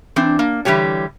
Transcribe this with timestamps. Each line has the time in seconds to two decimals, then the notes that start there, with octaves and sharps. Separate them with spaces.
0.16 E3 C4 D4
0.39 A#3
0.65 D3 E3 G3 G4 C#5